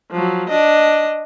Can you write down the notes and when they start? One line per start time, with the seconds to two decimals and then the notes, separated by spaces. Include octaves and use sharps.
0.11 F3 F#3
0.49 D4 D#5